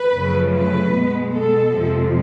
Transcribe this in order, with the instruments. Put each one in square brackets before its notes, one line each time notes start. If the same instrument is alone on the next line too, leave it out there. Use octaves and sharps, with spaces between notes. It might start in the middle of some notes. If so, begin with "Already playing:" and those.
Already playing: [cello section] B4
F#2 C#3 F3 A3
B4
B2 G#3 B3
A4
F2 C3 F3 G#3